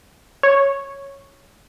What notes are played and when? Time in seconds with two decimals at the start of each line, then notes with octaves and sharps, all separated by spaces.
0.43 C#5